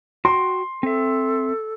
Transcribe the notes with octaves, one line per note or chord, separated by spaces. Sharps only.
F#4 G5 C6
C4 A4 E5